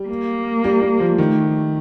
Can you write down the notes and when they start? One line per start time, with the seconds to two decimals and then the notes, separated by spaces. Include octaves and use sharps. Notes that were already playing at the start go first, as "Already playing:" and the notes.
Already playing: G3
0.09 A#3
0.64 G3
0.82 G3
1.00 F3
1.18 D#3 A3